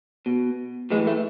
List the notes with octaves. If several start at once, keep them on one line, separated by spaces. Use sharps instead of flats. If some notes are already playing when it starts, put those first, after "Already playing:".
B2
A2 E3 G#3
A3